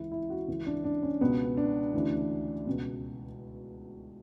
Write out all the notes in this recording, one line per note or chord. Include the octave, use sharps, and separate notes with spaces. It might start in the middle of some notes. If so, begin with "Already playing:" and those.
Already playing: C#2 C#3 E3 E4
E4
F#4
C#2 C#3 E3
D4
D4
C#4
C#2 B2 B3
D4
D2 C#3 E3
C#2 B2